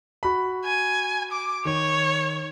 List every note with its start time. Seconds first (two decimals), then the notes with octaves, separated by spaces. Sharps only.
0.23 F#4 B5
0.65 G#5
1.32 D6
1.65 D#3 C#5